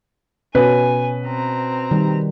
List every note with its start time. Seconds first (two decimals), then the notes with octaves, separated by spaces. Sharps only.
0.55 B2 C#4 B4 G#5
1.27 C4 A#5
1.91 D#3 G3